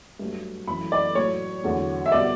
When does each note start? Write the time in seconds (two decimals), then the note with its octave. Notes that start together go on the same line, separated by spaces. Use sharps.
0.19 G2 F#3 A3
0.67 F#2 E3 A3 B5
0.92 D5
1.15 A2 F#3 A3 C#5
1.64 E2 D3 F#3 A3
2.06 E5
2.12 B2 G3 D5